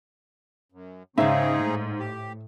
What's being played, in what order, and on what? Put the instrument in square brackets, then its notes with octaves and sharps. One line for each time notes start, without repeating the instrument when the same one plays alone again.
[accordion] F#2
[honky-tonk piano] G#2 [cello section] C#3 [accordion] C4 D#4 G#4 [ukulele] E5 F5
[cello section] A2
[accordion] G4